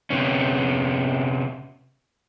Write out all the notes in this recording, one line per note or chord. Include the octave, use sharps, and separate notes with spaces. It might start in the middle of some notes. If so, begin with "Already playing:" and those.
C3 B3 C#4